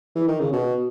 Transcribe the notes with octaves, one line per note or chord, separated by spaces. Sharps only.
E3
D#3
C#3
B2